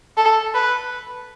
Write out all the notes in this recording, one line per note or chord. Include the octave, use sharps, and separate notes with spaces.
A4
B4